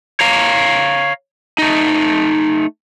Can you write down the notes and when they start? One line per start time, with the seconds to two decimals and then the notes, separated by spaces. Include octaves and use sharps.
0.21 C#5 F5 A#5
1.58 A3 D#4